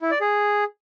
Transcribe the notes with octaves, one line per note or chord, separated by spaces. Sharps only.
E4
D5
G#4